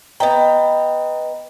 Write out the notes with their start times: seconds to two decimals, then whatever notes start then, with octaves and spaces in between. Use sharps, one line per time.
0.20 B3 D#5 G5 A#5